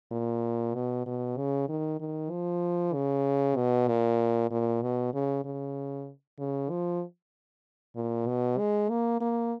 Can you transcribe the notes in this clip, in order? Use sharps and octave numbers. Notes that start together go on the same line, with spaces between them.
A#2
B2
B2
C#3
D#3
D#3
F3
C#3
B2
A#2
A#2
B2
C#3
C#3
C#3
F3
A#2
B2
G#3
A#3
A#3